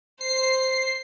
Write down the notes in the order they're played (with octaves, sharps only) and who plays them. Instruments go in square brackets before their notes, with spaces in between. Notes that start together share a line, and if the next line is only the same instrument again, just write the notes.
[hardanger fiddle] C5 [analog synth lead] C7